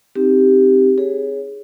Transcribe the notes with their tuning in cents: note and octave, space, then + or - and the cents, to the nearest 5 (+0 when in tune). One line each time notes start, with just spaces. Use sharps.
C4 +0 D#4 +0 G4 +0
G#4 +0 C#5 +0